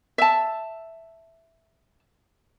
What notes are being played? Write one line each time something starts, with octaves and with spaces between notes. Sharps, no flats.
E5 A5